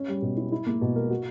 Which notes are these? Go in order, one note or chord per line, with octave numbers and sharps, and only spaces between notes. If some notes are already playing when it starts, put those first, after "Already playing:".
Already playing: C#4
G3
B2
E4
E4
A#3
B2
A#4
F#4